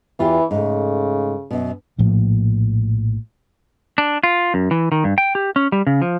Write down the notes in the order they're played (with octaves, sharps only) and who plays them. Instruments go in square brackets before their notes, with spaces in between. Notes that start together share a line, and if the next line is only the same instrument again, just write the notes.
[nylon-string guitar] E2 F4 G4 [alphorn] E3
[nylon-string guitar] G#2 A3 [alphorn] C#3
[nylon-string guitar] F#2 B2
[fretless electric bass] A#1 A2 F3 A#3
[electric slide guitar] D4
F4
F#2
E3
D#3
G2
G5
G4
C#4
G3
C#3
F3